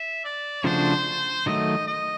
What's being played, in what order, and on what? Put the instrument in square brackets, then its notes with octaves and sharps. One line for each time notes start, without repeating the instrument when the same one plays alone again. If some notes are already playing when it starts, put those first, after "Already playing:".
Already playing: [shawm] E5
D5
[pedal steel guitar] C#3 F3 A3 D4 F#4 [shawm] C5
[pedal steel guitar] D#3 F#3 A3 [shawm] D#5
[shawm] D#5